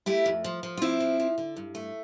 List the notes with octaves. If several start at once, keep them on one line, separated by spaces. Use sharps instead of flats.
A3 E4 G4
F2
F3
F3
F4
F3 C4 E4
F3
F3
D3
G2
A3